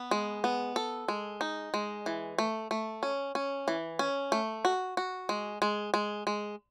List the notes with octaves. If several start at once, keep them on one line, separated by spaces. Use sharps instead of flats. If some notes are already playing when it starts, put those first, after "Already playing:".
Already playing: B3
G#3
B3
A4
G#3
D#4
G#3
E3
A3
A3
C#4
C#4
E3
C#4
A3
F#4
F#4
G#3
G#3
G#3
G#3